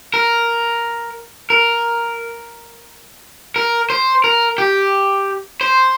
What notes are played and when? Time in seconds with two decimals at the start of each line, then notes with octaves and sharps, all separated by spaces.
0.14 A#4
1.50 A#4
3.56 A#4
3.90 C5
4.24 A#4
4.58 G4
5.61 C5